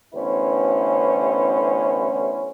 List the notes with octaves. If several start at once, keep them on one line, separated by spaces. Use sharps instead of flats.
A1 D3 B3 C#4 E4 C5